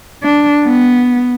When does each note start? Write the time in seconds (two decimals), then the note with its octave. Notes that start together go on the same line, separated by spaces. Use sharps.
0.23 D4
0.64 B3